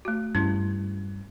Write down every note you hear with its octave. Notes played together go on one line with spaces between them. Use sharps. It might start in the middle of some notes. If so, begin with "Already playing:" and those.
A3 F#4
G2 C#4 E4